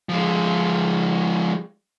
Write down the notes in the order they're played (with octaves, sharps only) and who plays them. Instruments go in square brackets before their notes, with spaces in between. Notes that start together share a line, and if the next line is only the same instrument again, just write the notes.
[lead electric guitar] F3 G#3